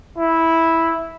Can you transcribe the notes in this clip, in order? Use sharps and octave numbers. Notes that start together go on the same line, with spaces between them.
E4